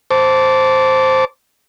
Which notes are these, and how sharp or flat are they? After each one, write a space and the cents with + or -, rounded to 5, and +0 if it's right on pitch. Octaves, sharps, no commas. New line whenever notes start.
C5 +0 A5 +0 D6 -25